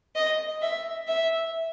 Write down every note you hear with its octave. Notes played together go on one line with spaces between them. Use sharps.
D#5
E5
E5